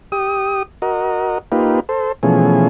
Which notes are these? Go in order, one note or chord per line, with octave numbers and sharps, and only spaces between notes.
G4 D#6
F#4 A#4 D#5
A#3 D#4 F4 G4 B4
A4 C5
B2 E3 F3 A3 C#4 G#4